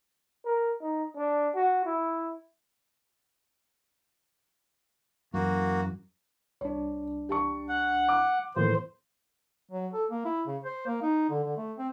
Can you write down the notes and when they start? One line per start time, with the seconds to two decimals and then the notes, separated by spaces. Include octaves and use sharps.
0.45 A#4
0.82 D#4
1.16 D4
1.55 F#4
1.85 E4
5.34 F#2 E3 A#3 F#4
6.61 C2 D4 C#5
7.29 G4 A5 C#6
7.69 F#5
8.09 D6
8.56 E1 A2 D#3 F3 A#3 B4 C5
9.71 F#3
9.93 A4
10.11 A#3
10.25 E4
10.47 C#3
10.64 C5
10.86 A#3
11.03 D#4
11.30 D3
11.44 D3
11.57 A3
11.78 C4